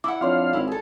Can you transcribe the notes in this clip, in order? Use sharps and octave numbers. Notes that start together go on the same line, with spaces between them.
E4 F#5 D6
F2 D4 F4 C#5 F5 C6 D6
G#1 E4
G#4 A4